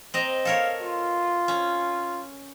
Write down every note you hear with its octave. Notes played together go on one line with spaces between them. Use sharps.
C4 D#5 A#5
A4 A#4 C#5 F5
F4
C#4